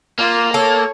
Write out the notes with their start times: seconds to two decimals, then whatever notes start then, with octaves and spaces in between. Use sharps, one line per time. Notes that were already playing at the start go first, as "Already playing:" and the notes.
0.19 A#3 F4
0.54 A4 C#5